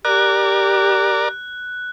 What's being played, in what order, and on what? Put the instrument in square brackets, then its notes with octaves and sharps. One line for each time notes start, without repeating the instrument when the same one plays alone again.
[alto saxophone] G4 [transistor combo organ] A#4 D5 [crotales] F#6